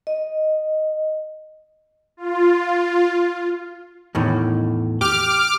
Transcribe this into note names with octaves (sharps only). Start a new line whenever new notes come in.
D#5
F4
E2 A2 D#3
G4 D6 F6